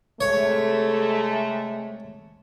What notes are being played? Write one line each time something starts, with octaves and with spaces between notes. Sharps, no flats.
C3 G#3 A3 C#5